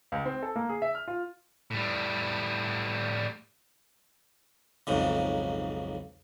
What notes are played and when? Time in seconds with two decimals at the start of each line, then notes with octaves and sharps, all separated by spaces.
0.12 C#2
0.26 C4
0.43 A4
0.56 A#3
0.69 G#4
0.82 E5
0.95 F6
1.08 F4
1.71 A2 G3
4.87 B1 F2 G#2 C#3